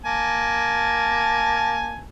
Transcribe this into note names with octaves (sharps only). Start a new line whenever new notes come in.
A#3 G#5 A5